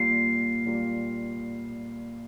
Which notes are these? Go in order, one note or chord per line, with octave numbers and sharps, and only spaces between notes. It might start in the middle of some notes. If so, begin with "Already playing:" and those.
Already playing: A#2 G3 A#3 F4 C7
A#2 G3 A#3 F4